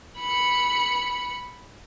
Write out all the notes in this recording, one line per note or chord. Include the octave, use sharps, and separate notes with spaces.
B5 C#7